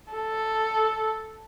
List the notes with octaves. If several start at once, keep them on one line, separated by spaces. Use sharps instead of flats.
A4